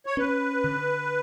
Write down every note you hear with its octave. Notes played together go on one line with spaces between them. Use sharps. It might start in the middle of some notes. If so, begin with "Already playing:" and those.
C#5
C#4 B4
D3